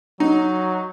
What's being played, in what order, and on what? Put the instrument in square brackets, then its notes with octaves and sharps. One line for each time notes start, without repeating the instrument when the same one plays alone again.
[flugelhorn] F#3 [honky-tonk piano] D#4